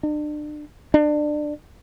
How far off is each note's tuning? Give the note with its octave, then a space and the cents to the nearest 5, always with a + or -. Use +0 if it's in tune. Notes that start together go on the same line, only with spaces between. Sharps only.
D4 +35
D4 +25